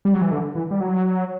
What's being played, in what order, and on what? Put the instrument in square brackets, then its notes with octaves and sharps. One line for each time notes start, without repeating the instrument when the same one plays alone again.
[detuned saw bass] G3
F#3
E3
D3
E3
G3
F#3